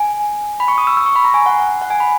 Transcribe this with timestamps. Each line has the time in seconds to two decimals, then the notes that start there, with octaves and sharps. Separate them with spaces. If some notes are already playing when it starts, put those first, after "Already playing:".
Already playing: G#5
0.60 B5
0.68 C#6
0.78 D#6
0.87 E6
0.97 E6
1.06 C#6
1.16 B5
1.24 A#5
1.34 G#5
1.46 F#5
1.59 F#5
1.82 F#5
1.90 G#5
2.00 B5